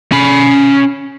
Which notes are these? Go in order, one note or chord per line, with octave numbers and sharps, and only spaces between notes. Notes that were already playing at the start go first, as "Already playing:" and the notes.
C#4 B5